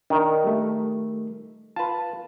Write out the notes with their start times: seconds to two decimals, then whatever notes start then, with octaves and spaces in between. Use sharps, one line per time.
0.10 D#3 D4 A#4
0.44 G3 A3
1.76 F4 B4 A5